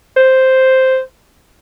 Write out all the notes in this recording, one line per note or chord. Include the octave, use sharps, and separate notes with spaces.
C5